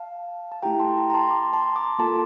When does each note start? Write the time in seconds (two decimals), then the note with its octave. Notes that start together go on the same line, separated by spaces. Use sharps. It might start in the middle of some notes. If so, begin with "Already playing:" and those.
Already playing: F5 A5
0.52 A5
0.63 A3 E4 G4 G5 A#5
0.80 A5 C6
0.97 G5 A#5
1.10 A#5
1.14 A5 C6
1.30 A#5 D6
1.53 A5 C6
1.76 A#5 D6
1.99 A#3 F4 A4 A5 C6